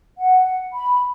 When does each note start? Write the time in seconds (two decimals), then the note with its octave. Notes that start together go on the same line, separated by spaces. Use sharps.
0.18 F#5
0.73 B5